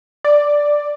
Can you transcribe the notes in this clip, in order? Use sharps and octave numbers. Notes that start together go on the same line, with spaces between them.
D5